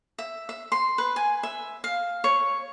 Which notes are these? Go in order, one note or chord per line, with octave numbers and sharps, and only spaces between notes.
E5
E5
C6
B4
G#5
E5
F5
C#5